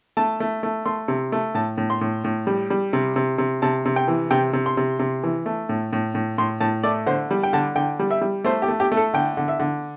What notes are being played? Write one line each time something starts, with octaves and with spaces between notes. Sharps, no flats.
A3 A5
A3
A3
A3 C6
C3
A3
A2 A5
A2
C6
A2
A2
G3
G3
C3
C3
C3
C3 A5
C3
G5
E3
C3 G5
C3
C6
C3
C3
E3
A3
A2
A2
A2
A2 C6
A2 A5
A3 D5
D3 C5
G3
G5
D3 A5
D3 G5
G3
E5
G3
A3 C5
G4
A3
G4
A3
A4
D3 G5
D3
E5
D3